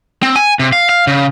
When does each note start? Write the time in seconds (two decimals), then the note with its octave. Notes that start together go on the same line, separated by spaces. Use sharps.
0.22 C4
0.36 G#5
0.59 C3
0.72 F5
0.89 F5
1.07 C#3